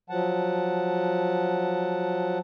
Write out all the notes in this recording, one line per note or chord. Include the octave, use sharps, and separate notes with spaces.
F3 F#3 F#5 A5